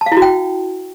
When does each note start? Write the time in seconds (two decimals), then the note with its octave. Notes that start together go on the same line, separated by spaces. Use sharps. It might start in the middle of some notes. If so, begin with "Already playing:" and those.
0.01 A5
0.06 F5
0.12 E4
0.17 F#4
0.22 G5